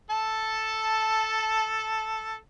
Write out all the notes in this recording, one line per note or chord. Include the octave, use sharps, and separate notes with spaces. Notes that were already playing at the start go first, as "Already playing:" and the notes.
A4 A5